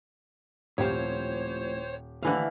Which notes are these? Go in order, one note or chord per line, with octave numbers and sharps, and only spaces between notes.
D#1 A2 F3 C4 G4 C5 C#5
D#2 A2 D3 E3 E4 F5